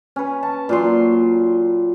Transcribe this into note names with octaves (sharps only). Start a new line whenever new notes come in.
C#4 B4
A5
A#2 F#3 C6